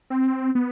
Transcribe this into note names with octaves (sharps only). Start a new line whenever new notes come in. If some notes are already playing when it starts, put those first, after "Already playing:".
C4
B3